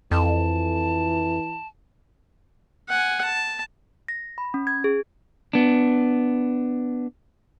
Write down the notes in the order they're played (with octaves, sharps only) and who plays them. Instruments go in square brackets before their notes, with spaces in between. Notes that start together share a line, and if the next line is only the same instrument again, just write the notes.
[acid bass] F2 [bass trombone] E3 [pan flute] A5
[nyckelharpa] F#5 G#5
A5
[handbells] A#6
B5
C#4
G#6
G#4
[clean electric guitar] B3 D4